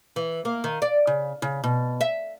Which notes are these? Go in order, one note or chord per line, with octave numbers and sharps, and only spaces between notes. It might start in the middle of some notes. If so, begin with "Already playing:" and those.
E3
A#3
D#3
D5
C#3
C#3
B2
E5